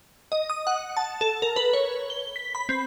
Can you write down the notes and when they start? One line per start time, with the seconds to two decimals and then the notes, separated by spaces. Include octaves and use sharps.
0.32 D#5
0.50 D#6
0.67 F#5
0.97 A5
1.21 A4
1.42 A#4
1.56 B4
1.73 C#5
2.10 G7
2.36 B6
2.55 B5
2.69 C4